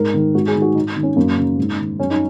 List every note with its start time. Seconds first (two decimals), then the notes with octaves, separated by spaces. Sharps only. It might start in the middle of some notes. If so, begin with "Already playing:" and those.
Already playing: G#2 A#4
0.14 D#3
0.35 G#2 F#4
0.48 G#4
0.55 D#3
0.62 F#4
0.75 G#2 D#4
0.96 D#3
1.03 C#4
1.16 F#2 A#3
1.37 C#3
1.58 G#2
1.79 D#3
1.99 F#2 C#4
2.10 D#4